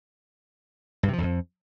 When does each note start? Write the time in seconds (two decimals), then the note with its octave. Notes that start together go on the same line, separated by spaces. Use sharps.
1.03 G2
1.08 C3
1.13 F3
1.18 E2
1.23 F2